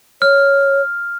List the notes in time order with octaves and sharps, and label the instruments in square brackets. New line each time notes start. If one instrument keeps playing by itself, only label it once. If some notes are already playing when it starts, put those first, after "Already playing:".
[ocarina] C#5 [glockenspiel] F6